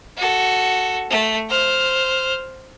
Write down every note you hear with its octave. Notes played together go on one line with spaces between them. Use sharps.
F#4 A4
A3
C5 F6